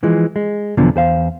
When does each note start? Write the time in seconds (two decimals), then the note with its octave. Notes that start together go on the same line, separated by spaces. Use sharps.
0.03 E3 F3 G#3
0.36 G#3
0.77 E2 B2 D3 F3 F#3
0.96 E2 C5 F5